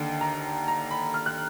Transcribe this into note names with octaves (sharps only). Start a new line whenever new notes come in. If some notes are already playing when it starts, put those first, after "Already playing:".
Already playing: D#2 D3 A5
A#5
A#5
B5
F6
F#6